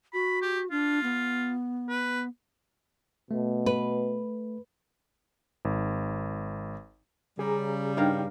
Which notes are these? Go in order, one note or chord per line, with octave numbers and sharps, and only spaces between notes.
F#4 B5
G4
D4 F4
B3
B4
B2 A3
B4
G#1
C#3 G3 G#4 A#5
G2 D#4 A#4 F5 G5